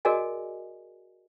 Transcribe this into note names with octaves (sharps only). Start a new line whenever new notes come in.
F#4 G#4 A#4 D5 D#5 G#5